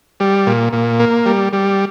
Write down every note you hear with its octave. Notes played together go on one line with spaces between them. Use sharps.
G3
A#2
A#2
A#3
G3
G3